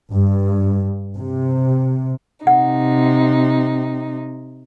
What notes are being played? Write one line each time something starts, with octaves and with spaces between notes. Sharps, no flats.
G2
C3
C3 D#4 F#5